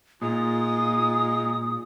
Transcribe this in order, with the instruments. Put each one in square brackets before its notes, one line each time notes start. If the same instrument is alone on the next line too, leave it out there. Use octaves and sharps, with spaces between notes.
[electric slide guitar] A#2 [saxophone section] G#3 D#4 F4 [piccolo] D#6